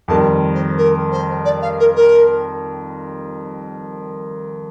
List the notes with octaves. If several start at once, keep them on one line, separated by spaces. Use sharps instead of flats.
F2 D#3 G3 A5
C5
A#4
C5
D5
F5
A#4
A#4